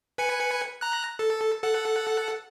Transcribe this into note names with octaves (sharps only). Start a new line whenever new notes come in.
B4 G#5 C#7
A#5 F#6
A4
A4 F#5